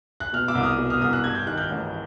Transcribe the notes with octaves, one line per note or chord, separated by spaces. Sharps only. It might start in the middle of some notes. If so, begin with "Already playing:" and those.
F#6
B2 F6
D6 E6
C2
D#6 F6
B2
D#6 F6
C2 D#6 F6
E6 F#6
G2 G#6
G6
D#3 F#6
F6 G6
A1